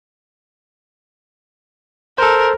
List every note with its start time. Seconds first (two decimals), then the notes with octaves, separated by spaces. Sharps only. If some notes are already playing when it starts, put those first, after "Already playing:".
2.18 A4 A#4 C5